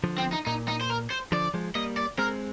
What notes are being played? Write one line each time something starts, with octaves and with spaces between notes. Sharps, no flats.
D3 F3
C4
D#4
A#2 D#4
D#4
C5
A#4
C5
D3 F3 D5
F3 G#3
G3 A#3 D#5
D5
G#3 C4 A#4